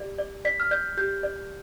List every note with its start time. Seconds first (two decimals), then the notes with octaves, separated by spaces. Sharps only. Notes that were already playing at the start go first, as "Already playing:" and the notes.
Already playing: G4 D5
0.18 D5
0.45 D5 B6
0.60 F6
0.71 D5 G6
0.97 G4 G6
1.23 D5